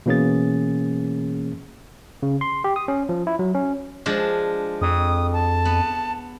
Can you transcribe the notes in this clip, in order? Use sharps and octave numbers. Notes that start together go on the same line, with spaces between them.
B2 E3 A#3 C#4 G#4 A6
C#3
C6
G4
D#6
C#4
F3
E4
F#3
C#4
F3 G#3 D4
F2 D#6
A5
B3